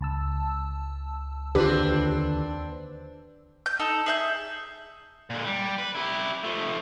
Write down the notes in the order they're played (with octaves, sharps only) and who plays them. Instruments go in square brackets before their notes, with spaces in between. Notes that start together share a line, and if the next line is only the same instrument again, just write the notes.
[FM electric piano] C#2 A5 E6
[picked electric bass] D#2 D3 [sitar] C4 D4 B4 [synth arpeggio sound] F4 G4
[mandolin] G6
D#4 A4
G#4 E5 G6
[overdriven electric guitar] A#2 D3
G3
B4
E4 G4
F3 A3